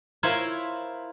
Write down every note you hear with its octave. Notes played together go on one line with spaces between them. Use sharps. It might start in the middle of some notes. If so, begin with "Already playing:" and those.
E4 F4 A#4 C5 C#5